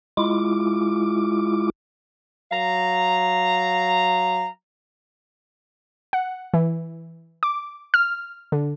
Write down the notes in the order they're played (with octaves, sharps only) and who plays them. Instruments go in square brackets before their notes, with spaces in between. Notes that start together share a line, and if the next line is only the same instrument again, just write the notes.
[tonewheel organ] G#3 E4 F4 D6
[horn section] F#3 F5 A#5
[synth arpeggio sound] F#5
E3
D6
F6
D3